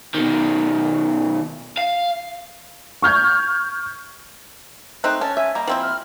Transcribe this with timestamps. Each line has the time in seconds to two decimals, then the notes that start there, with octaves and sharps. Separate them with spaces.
0.15 B2 D#3
1.78 F5
3.02 C#6 F6 G6 G#6
5.04 A3 C4 D#4 C5 F#6
5.21 C#4 A4 A5
5.37 E5 G#5
5.55 G3 A#3 D#5
5.67 F3 C4 E4
5.82 F6